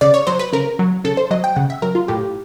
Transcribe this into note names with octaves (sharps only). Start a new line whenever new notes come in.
C#3 D5
C#5
F#3 C5
B4
C#3 A#4
F#3
C#3 A4
C5
F#3 D#5
G5
C#3 F#5
E5
F#3 A#4
F4
A2 G4